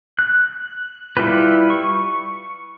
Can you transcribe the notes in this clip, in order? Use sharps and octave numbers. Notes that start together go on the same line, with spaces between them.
F#6
G3 E4 F4 G4 B4
C#6